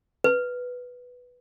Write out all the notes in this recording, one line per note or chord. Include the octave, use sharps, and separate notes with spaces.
B4